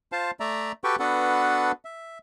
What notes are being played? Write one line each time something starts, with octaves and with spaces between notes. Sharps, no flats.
F4 C5 F5 A5
A3 D5 E5 A#5
F#4 G4 A4 B4 G5 C#6
B3 D4 F#4 A4 B4 F#5
E5